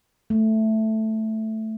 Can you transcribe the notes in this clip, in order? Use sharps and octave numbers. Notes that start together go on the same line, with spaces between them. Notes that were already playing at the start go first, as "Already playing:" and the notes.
A3